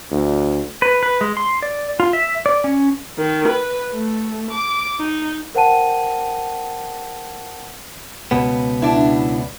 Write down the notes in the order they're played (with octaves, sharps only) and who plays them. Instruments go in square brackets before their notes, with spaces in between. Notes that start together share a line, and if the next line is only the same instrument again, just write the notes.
[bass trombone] D2
[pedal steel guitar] B4
B4
G#3
C6
D5
F4
E5
D5
C#4
[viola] D#3
B4
A3
D6
D#4
[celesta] A#4 C5 F#5 G5 A5 D#7
[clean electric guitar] C#2 B2 B3
[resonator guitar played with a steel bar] D4 E4